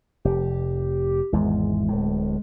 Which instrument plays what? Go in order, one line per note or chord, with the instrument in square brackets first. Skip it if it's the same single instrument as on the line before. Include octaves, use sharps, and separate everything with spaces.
[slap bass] F1 [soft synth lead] G4
[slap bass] G#1 E2 G#2 [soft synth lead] G#3
[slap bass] D1 A2